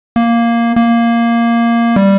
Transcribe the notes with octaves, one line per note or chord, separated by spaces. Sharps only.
A#3
A#3
G3